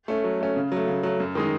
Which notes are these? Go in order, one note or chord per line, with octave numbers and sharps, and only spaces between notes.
A3 C#4
F#3
A3 C#4
C#3
F#3 A3
C#3
F#3 A3
F#2
D#3 G#3 D#4